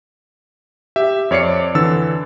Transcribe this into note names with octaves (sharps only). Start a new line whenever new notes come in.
G4 E5
F2 C#5 D5 C7 C#7
D3 E3 E6 A6